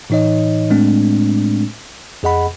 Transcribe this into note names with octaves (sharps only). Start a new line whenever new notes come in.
A2 E3 D#4 C#5 D#5
A2 G#3 A3 C4 D4
F2 G#4 D#5 F#5 B5